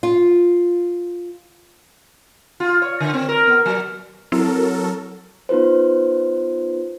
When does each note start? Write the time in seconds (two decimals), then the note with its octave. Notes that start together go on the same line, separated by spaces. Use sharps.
0.03 F4
2.60 F4
2.82 C#5
3.00 D3
3.14 C4
3.29 A#4
3.47 B3
3.66 F#3
4.32 F#3 C4 E4 A4 A#4
5.49 B3 D#4 F4 B4 C5